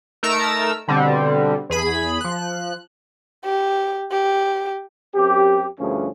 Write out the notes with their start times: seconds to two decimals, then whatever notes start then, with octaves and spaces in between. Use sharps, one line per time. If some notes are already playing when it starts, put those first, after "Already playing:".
0.23 A3 D#4 A#4 A5 A#5 E6
0.88 B2 D3 G3 C4
1.70 E2 G#4 B5
2.21 F3 F#6
3.45 G4
4.11 G4
5.15 F#2 C4 G4
5.79 D2 G2 F3 C#4 G#4